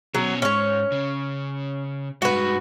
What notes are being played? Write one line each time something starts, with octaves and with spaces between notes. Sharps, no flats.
B2 F#3 C#4
G#2 C#4 C#5
C#3
G2 G#3 F#4 B4